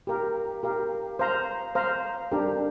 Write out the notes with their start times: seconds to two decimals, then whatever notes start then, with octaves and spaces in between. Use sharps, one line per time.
0.07 G4 A#4 F5
0.63 G4 A#4 F5
1.19 C5 F5 A#5
1.75 C5 F5 A#5
2.32 D4 G4 A#4